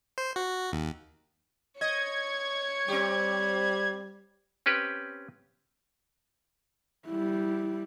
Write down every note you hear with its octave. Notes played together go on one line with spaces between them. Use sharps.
C5
F#4
D#2
C#5 D#5 C#6 G#6
G3 C4 G4
C4 C#4 G4 B4
G3 E4